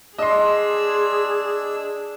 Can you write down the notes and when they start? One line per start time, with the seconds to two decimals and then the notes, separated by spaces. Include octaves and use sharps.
0.18 D4 G#4 D#5 C6 E6